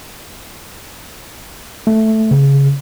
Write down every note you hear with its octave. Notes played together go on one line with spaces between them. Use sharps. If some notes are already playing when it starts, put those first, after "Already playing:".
A3
C#3